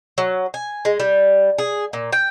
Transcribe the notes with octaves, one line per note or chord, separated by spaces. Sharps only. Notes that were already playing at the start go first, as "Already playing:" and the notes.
F#3
G#5
G#3
G3
G#4
A#2
G5